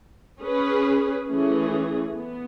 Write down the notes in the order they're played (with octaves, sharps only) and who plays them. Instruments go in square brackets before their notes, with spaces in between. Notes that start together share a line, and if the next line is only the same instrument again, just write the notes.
[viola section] C#4 G#4 B4
E3 A3 C#4 G#4
B3